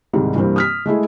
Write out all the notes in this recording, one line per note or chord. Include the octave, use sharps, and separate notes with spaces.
C2 G#2 C3 D#3 G3
G2 C3 E3 G3 A#3 C4
D#6 F6 B6
G#3 A3 E4 G#4